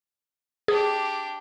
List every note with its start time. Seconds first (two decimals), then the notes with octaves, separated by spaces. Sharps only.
0.68 D4 G4 G#4